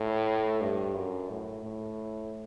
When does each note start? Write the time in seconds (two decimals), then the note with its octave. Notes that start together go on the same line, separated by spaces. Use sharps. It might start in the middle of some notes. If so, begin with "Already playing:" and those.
Already playing: A2
0.61 G2
0.95 F#2
1.29 A2
1.64 A2